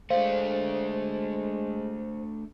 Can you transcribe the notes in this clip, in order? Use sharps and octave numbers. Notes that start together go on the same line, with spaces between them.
G#3 A3 D4 C5 F5